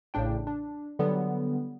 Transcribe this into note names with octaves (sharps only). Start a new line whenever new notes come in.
A1 A2 C#3 D4 G5
D4
D3 F#3 G3 B3